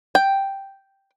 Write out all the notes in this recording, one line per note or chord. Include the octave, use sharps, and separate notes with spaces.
G5